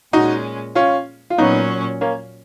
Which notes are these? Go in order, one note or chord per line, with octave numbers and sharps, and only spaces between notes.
A#2 G#3 C#4 D#4 F#4
C#4 F4
F4
A#2 F#3 B3 C#4 D#4
A#3 C#4